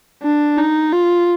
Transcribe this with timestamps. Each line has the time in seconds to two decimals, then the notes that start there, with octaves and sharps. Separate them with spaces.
0.23 D4
0.58 D#4
0.93 F4